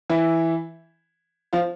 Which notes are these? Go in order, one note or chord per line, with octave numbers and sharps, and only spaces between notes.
E3 E4
F3 F4